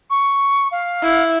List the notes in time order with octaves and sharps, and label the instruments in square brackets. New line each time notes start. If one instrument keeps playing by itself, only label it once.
[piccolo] C#6
F5
[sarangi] E4